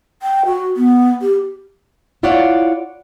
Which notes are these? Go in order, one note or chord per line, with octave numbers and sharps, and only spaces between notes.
G5
F#4
B3
G4
E4 F4 C#5 D5 F#5